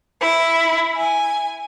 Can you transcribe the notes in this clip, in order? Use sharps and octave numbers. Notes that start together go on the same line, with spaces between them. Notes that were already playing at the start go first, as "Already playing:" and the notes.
E4
G#5